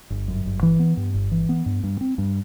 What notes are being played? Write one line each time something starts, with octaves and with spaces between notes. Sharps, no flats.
G1
F#2
G1
E3
B3
G2
G1
E3
B3
G2
G2
C4
G2